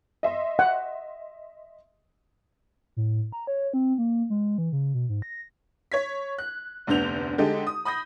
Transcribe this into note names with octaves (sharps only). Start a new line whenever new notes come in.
D#5 E5 C6
F#5
A2
A#5
C#5
C4
A#3
G#3
E3
C#3
B2
G#2
A#6
C#5 G#6 B6
F#6
F1 D2 D3 B3 G6 F7
D3 G#3 D#4 G4 A4
D#6
B5 D#6 G6 A#6